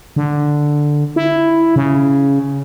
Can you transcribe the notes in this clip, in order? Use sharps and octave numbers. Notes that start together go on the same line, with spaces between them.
D3
E4
C#3